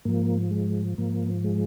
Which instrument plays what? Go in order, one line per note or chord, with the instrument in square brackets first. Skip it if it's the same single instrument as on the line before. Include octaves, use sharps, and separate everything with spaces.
[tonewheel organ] G#2 F3 A#3
G#3
G#2 F3 A#3
G#3